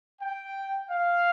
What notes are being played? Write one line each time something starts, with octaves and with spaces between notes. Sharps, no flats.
G5
F5